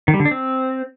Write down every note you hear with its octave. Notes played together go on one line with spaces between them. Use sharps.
D#3
G3
D3
D4
C4